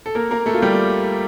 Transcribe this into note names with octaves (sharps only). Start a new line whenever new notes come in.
A4
A#3 A#4
A#3 A#4
A3 A4
F4
G3 G4